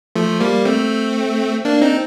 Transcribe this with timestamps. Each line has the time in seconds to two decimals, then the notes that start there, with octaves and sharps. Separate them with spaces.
0.16 F3 A3
0.40 G3 A#3
0.65 A3 C4
1.65 A#3 D4
1.82 C4 D#4